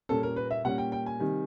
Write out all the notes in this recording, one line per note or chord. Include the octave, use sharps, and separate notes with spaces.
A#2 G3 A#3 C#4 A4
A#4
B4
E5
A#2 G3 A#3 C#4 F#5
G5
G5
G#5
C3 D#3 G3